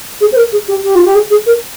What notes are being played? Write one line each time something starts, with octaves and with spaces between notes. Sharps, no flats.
G#4
C5
A#4
G#4
G4
G4
F4
G4
G#4
G#4
A#4